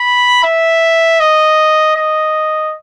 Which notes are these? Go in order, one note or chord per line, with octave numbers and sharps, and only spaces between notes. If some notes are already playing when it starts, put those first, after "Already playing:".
Already playing: B5
E5
D#5
D#5